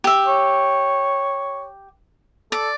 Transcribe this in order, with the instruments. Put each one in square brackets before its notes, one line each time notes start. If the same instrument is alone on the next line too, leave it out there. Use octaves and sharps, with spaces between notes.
[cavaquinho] G4 E5
[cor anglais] C#5
[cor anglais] A4 [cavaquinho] D5